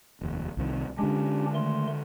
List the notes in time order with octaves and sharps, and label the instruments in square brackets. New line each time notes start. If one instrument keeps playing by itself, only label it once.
[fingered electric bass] F1 D#2
C2 C3 D#3
[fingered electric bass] D3 G#3 [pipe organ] C#4 D4 G4
[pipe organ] D#3 A3 C6